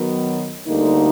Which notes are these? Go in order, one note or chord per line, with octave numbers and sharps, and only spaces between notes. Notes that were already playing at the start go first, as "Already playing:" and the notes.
Already playing: D#3 F#3 B3
D2 D3 G3 A#3 D#4